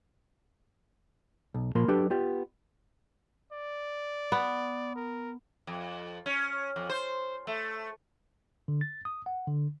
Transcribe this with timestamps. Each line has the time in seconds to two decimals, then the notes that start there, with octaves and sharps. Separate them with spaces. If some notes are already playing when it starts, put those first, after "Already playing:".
1.54 B1
1.75 A#2 F3 A#3 A#4 B5 C6
1.88 F#3 D4 G4 A4 B4 D5
2.10 B3 F4 G4 D5
3.52 D5
4.32 B3
4.96 A#4
5.67 F2
6.26 C#4
6.76 F2
6.89 C5
7.47 A3
8.68 D3
8.81 A6
9.05 D#6
9.26 F#5
9.47 D3